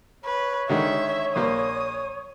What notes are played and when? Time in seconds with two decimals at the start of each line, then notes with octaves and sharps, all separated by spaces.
0.25 B4 C#5
0.69 D3 D#3 G#3 E5
1.36 A#1 A#3 C5 D#6